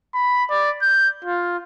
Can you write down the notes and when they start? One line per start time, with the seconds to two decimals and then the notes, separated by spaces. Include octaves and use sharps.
0.14 B5
0.50 D5
0.82 G6
1.25 F4